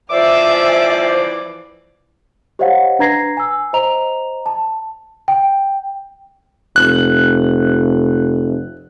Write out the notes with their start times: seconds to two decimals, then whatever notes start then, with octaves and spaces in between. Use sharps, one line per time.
0.11 E3 F3 C5 D5 E5 G#5 D6
2.59 G4 C5 C#5 D#5 F5 F#5
2.99 D4 B4 A#5 G#6 A#6 C7
3.37 G#5 E6
3.73 C5 D#5 A#5 F7
4.46 A5
5.28 G5
6.76 F1 F#6